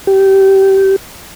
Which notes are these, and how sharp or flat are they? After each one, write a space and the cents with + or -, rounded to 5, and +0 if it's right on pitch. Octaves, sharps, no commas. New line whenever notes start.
G4 -20